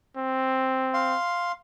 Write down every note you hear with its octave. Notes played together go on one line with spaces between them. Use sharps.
C4
F5 C6